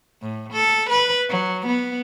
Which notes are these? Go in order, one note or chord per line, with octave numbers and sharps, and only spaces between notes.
A2
A4
B4
F#3
B3